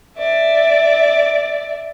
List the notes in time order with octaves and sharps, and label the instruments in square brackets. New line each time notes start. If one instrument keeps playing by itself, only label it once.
[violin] D5 E5